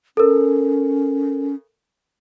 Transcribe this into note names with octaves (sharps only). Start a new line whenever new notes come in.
C#4 A4 A#4